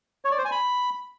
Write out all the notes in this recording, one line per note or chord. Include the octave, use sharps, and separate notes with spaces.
C#5
D5
C5
G#5
B5